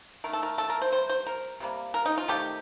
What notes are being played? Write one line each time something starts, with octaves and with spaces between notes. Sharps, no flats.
D#3 A3 A#4
A4
A#4
A4
A#4
C5
C3 G3 C5
C5
A#4
C3 G3 A#3
A#4
D#4
F4
C3 D#3 A3 G4